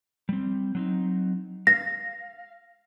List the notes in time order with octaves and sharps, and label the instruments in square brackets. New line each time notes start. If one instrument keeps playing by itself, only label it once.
[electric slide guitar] G3 C4
F#3 C4 D#4
[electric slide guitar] F5 [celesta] A#6